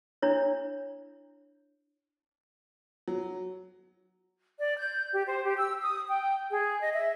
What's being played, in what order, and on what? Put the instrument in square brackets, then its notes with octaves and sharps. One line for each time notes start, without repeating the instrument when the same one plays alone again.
[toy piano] D4 E4 C#5
[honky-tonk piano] F#3
[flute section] D5
G6
G4
C5
G4
E6
D#6
G5
G#4
D#5
E5